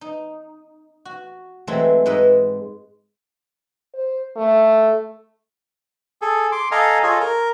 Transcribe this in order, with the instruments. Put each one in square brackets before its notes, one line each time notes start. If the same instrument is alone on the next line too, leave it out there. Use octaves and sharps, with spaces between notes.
[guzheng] D#4
F#4
E3 F#3 G#3 A3 C4
G#2 G#3 B4 D#5 E5
[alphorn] C5
A3
[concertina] G#4 A4
C6 D6
A4 D#5 F5 G#5 A#5
F4 G#4 A4 C#5 D#5
A#4